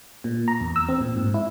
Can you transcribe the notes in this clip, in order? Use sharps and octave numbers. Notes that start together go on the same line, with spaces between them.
A#2
A#5
E2
E6
C4
A#2
G#2
E4